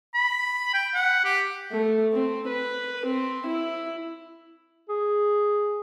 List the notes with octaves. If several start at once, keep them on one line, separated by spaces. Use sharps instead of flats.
B5
G5
F#5
G4
A3
C4
B4
C4
E4
G#4